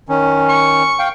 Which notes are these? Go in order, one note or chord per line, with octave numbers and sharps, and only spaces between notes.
D#3 C#4
C#6
F5 G5